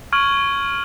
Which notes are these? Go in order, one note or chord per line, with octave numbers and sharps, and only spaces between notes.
C#6 F6 G#6 D#7 F#7